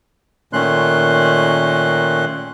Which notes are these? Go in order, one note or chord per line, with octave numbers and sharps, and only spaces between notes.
A#2 D#3 A3 C#4 C6 F#6